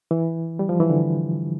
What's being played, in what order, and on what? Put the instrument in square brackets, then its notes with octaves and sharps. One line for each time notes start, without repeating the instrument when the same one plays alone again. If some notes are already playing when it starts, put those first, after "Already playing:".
[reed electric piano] E3
G3
F3
E3
D3